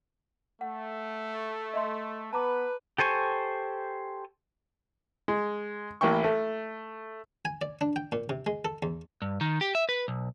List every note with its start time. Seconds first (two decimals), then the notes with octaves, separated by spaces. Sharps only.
0.61 A3 F#5
1.74 D#5 E5 C6
2.33 B3 B4 A5 A#5 D6
2.98 G4 A4 C5 G#5 C#6
5.28 G#3
6.01 A1 A#3 E4 G5 C#6
6.24 A3
7.45 G#5
7.62 D5
7.81 D4
7.96 G5
8.12 A#2
8.29 C3
8.47 G#3
8.65 A4
8.83 E2
9.22 G2
9.41 D#3
9.61 G4
9.75 E5
9.89 B4
10.08 B1